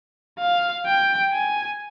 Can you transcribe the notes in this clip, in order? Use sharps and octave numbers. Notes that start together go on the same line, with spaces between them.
F5
G5
G#5